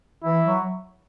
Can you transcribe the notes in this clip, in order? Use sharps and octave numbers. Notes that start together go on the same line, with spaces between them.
E3 E4
F#3